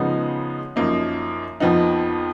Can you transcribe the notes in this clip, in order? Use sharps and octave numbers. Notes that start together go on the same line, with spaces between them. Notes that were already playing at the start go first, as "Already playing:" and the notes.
Already playing: C#3 F3 G#3 B3 D#4
F#2 F3 A#3 D#4
F2 F3 B3 D#4